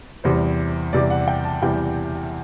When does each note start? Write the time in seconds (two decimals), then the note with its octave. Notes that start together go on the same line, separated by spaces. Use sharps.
0.24 E2 C3 E3 G3 C5
0.93 E2 C3 E3 G3 D5
1.10 F#5
1.28 G5
1.45 A5
1.62 E2 C3 E3 G3 G5